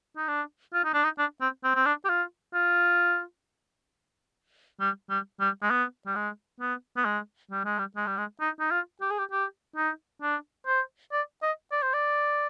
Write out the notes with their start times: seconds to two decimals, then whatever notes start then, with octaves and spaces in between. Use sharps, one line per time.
0.17 D#4
0.28 D4
0.73 F4
0.84 D#4
0.93 D4
1.04 D#4
1.18 D4
1.41 C4
1.64 C4
1.75 C4
1.86 D4
2.05 G4
2.09 F4
2.54 F4
4.80 G3
5.10 G3
5.40 G3
5.62 G#3
5.70 B3
6.06 G3
6.15 G#3
6.60 B3
6.97 B3
7.05 G#3
7.51 G3
7.65 G#3
7.78 G3
7.96 G#3
8.07 G3
8.17 G#3
8.40 D#4
8.59 D#4
8.71 F4
9.01 G4
9.11 G#4
9.19 G4
9.31 G4
9.76 D#4
10.22 D4
10.66 C5
11.12 D5
11.42 D#5
11.72 D5
11.82 C5
11.93 D5